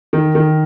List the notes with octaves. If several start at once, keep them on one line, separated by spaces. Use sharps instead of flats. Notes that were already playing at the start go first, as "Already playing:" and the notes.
D#3
D#3